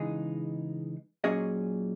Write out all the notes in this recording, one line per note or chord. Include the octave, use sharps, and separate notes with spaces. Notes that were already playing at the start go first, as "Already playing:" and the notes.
Already playing: C#3 E3 G#3 D#4 G#4
A#2 F#3 C#4 G#4 D#5